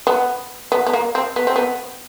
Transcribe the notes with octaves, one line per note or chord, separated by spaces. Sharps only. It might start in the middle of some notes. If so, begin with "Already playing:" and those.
B3
B3
B3
A#3
C4
B3
C4
B3